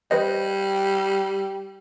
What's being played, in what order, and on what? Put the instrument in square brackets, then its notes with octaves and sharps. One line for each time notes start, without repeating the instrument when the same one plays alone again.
[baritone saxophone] G3 [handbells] B4 C5 D#5